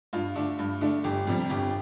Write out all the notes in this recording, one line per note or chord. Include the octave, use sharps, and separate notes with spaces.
G2 F4
D3 A3 D4
G2
D3 A3 D4
G1 G4
F2 C3 G3
G1 G4